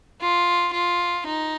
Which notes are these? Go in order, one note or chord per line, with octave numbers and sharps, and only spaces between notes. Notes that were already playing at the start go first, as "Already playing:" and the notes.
F4
F4
D#4